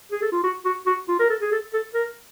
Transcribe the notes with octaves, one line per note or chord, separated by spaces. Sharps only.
G#4
A4
F4
F#4
F#4
F#4
F4
A#4
A4
G#4
A4
A4
A#4